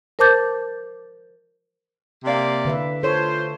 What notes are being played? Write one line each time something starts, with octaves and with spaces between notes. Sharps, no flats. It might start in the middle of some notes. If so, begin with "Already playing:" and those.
A#4 C5 A5 D6 G6 A6
C3 A#3 D5
D3 B4 E5
F4 A4 C5 C#5